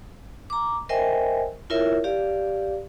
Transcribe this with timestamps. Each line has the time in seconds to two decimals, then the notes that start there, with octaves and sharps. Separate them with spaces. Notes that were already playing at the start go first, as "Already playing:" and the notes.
0.50 A#5 D6
0.89 A#4 C5 D#5 E5 G5 G#5
1.70 E4 F4 A#4 C#5 E5
2.04 G4 D5 F5